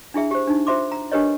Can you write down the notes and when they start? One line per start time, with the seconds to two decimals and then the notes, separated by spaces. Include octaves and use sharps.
0.14 D4 E4 G#4 E5
0.31 G4 C5
0.48 D4 D#4
0.67 F4 C5 E5 C6 D6
0.92 A#5
1.12 D4 G4 A#4 B4 C#5 D#5